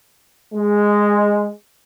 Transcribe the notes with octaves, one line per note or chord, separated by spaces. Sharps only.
G#3